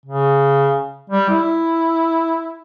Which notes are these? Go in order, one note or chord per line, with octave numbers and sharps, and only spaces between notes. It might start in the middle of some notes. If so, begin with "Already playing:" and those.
C#3
G3
E4